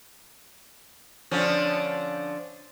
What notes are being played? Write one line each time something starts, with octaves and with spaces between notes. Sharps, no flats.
D3 F3 C#4